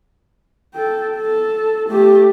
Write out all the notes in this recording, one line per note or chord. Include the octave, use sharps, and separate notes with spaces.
A4 G5
A4
A3 G4